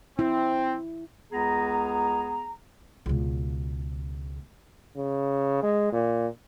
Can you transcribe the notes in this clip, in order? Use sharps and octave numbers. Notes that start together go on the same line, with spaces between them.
C4 E4
C#2 B3 G#4 A#5
C#2 B2
C#3
G#3
A#2